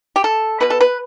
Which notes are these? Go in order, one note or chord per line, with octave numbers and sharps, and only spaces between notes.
G4
A4
B2 B3 B4
A4
B4